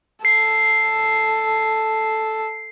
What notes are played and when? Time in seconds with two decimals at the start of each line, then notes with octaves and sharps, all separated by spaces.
0.25 A4 C7